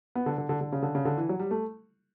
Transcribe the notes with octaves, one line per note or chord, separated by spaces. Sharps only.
B3
D3
D3
D3
D3
C#3
D3
C#3
D3
E3
F#3
G3
A3